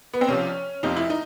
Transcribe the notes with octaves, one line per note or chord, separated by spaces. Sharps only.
B3
C4
C2 C3 F3 C#4
F1 F2 C3 F3 D#4
E4
D#4